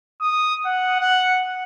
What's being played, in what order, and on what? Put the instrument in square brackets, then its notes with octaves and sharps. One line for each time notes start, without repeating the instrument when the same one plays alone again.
[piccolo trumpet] D#6
F#5
F#5